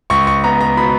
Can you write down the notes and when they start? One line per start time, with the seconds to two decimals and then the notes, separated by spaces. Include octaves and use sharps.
0.10 C#2 C#6
0.27 C#6
0.44 B3 A#5
0.61 A#5
0.77 B2 B5